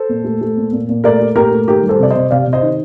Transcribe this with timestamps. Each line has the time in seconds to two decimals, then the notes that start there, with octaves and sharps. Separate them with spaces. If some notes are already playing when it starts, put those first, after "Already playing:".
Already playing: A4 C5
0.09 A#2
0.24 A3
0.41 A3
0.57 A#2
0.73 A#2
0.89 A#2
1.04 A3 A#4 D5
1.20 A3
1.36 A#2 G4 A#4
1.52 A3
1.68 D#3 G4 A#4
1.83 G3
1.89 A4 C5
2.00 C3 D5
2.10 C3 C5 D#5
2.31 C3 D5 F5
2.47 C3
2.53 C5 D#5
2.62 D#3